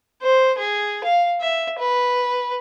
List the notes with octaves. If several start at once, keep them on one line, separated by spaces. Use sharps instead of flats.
C5
G#4
F5
E5
B4